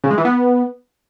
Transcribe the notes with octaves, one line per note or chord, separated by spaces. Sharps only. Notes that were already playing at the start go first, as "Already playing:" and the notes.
C#3
G#3
E3
B3